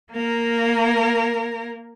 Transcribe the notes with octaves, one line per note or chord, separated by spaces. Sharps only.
A#3 A#4